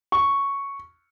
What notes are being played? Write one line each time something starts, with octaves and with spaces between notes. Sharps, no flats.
C#6